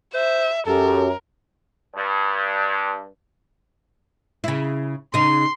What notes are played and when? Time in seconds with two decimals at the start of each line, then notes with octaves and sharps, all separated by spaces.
0.14 C5 E5
0.67 F#2 G4 A4 A#4
1.96 G2
4.44 C#3 E4
5.14 C#3 D#4 C6